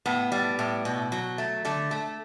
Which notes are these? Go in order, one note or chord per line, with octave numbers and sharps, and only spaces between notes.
A2 B3
G3
A2
B2
F#3
A3
D3 A3
A3